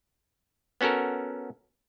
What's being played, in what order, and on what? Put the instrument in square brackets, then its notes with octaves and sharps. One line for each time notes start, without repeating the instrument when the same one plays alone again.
[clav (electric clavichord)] B3 C#4 F#4 A4 A#4